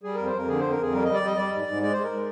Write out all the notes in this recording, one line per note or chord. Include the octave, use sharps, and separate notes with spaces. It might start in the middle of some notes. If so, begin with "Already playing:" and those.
G3 G#4
F2 A#4
C5
F2 A#4
D3 G#4
F2 C5
A#4
F2 G#4
G3 A#4
G3 D#5
D5
G3 D#5
G3 D5
G#2
G#2
G#3 D5
G#3 C5
A#4
G#3